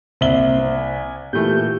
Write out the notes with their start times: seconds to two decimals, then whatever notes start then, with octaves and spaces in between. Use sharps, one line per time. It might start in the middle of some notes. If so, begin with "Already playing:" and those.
0.21 C2 A#3 C4 C5 E5 G7
0.75 G#5
1.33 A#2 E3 A3 G4 G6